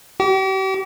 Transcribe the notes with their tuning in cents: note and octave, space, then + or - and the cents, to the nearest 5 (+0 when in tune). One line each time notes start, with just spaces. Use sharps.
G4 -40